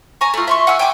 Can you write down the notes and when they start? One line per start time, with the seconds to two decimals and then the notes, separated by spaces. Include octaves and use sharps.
0.21 G#5 A#5 C#6
0.34 A3 F4
0.47 E5 C6 C#6
0.67 F#5 G#5 E6
0.79 G5 G#5 D6